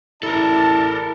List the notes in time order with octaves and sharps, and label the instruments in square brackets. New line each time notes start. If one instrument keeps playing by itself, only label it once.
[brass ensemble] A1 D5 A5 [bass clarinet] E4 [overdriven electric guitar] A4 A#4